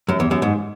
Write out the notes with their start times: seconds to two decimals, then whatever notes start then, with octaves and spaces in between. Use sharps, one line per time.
0.09 F#2
0.20 E2
0.31 F#2
0.42 G#2